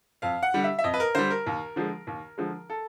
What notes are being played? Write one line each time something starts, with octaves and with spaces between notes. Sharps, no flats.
F2 F5
F#5
D3 G3
E5
E5
F2 D#5
B4
A#4
D3 G3 C5
A#4
D#2
D3 F3 G#3
D#2
D3 F3 G#3
A4